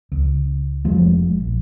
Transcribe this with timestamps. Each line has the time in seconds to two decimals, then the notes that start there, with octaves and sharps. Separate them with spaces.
0.12 C#2
0.85 F1 F3 G#3
1.40 A#1